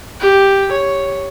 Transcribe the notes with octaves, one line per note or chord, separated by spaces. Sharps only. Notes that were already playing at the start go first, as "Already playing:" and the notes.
G4
C#5